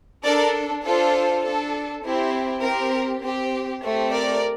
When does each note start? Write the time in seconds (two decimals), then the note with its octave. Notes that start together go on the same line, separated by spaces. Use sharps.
0.24 D4 A4 A#4 D5
0.83 D4 F4 A4 C5
1.44 D4 A4
2.03 C4 E4 G4
2.63 C4 G4 A#4
3.22 C4 G4
3.82 A3 C4 G4 C5
4.12 A#4 D5